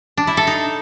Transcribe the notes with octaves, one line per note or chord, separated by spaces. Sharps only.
D4
E4
A4
D#4